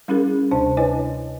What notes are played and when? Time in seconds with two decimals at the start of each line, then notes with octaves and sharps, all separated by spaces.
0.08 G3 C#4 E4 G#4 A#4
0.51 D2 C3 D4 C5 A5
0.77 E4 B4 C#5 D#5 G#5